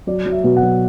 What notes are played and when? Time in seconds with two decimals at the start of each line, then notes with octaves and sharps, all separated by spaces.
0.07 F#3 D5
0.26 F#3
0.32 E5
0.44 B2
0.57 F#5
0.62 F#3